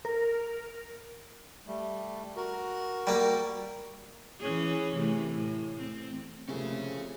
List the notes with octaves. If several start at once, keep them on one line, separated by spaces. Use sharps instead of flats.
A#4
G3 A3
F#4 A#4
G3 A#3
E3 C#4 G#4
C3 E3 A3
A2
C4
F2 C3 A3 A#3 C#4 E4 G#4